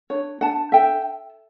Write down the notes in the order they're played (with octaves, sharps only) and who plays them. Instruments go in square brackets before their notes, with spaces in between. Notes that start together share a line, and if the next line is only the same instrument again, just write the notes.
[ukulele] D4 C#5
D4 F#5 A5
A4 E5 G5